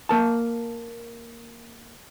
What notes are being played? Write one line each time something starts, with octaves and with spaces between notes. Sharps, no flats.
A#3 A#4 A5